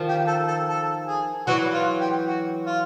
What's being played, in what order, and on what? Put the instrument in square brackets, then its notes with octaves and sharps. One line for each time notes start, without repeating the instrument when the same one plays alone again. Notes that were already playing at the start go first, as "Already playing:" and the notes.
Already playing: [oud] D#3 F3
[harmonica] G4
A4
A4
A4
G#4
[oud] E3 F#3 [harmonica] F#4
[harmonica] F4
G4
F#4
F4